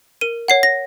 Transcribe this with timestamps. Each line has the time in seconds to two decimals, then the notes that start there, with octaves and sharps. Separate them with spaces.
0.21 A#4 D#7
0.48 C#5 F#5 C7
0.63 A#6